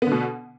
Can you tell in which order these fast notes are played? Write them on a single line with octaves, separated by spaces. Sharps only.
B3 D3 B2